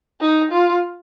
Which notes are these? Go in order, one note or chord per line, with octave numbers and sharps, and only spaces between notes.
D#4
F4